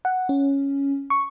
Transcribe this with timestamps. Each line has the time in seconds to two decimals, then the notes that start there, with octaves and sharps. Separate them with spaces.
0.05 F#5
0.29 C#4
1.10 C#6